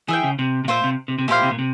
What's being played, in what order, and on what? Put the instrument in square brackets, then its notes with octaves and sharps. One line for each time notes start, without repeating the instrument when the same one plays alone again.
[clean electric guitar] E3 [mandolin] G#4 E5 G5
[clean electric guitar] C#3
C3
C3
[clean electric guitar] A#2 [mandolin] F4 C5 E5
[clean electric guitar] C3
C3
C3
[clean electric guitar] A#2 [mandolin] E4 G4 C5 F5
[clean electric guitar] C3
A#2
C3